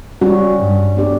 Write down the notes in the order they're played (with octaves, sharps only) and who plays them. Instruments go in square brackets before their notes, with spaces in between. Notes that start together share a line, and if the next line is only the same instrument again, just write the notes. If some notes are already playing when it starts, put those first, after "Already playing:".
[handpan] G3 C#4 F#4
[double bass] G2
[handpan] B3 D4 G4 D5